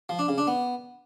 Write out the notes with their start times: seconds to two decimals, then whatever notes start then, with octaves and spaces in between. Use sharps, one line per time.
0.09 F3
0.19 D4
0.28 C#3
0.38 D4
0.47 B3